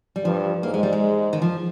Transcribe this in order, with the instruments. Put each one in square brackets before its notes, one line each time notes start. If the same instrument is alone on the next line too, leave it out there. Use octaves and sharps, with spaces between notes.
[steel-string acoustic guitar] G3
[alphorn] G2 [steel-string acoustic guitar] F3
[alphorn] G#2 [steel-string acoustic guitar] A#3
[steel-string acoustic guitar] G#3
G3
G#3
D#3
F3